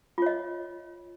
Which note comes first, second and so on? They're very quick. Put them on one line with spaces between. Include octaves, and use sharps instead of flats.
F4 C#5 D#5